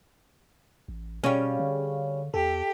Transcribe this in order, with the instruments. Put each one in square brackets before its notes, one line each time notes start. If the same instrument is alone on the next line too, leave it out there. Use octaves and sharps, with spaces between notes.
[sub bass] A1
[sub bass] B2 [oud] G3 C#4 [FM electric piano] G#4 C#5 F5
[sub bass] D3
[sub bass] E2 [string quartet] G4 [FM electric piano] A4